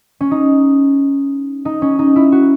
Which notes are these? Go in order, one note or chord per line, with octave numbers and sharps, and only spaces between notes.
C#4
D#4
D#4
C#4
D#4
E4
F#4